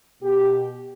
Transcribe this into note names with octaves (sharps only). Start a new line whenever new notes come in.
B2 G4